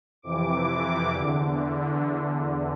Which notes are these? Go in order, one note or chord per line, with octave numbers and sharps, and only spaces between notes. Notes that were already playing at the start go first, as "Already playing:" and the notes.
F2 C3 E3 D6
E2 D3